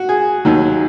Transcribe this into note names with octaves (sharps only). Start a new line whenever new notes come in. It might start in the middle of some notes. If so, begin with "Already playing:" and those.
Already playing: F#4
G#4
D#2 D#3 F#3